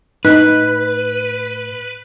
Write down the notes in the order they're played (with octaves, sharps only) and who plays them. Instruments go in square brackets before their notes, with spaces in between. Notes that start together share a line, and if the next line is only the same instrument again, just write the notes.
[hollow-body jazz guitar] A2 [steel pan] D#4 [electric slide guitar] B4 [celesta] F#6